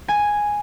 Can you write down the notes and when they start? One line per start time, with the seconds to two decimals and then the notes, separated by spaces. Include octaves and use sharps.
0.08 G#5